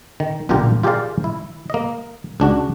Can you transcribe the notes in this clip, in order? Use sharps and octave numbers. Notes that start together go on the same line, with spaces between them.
D#3
B1 A#2 D3 F4 G4 A#4
F4 G4 G#4 A#4 D5 F5
E4
A#3 D#5
C#2 D4 F#4